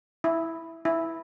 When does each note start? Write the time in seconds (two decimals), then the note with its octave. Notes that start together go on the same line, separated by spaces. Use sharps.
0.24 E4
0.85 E4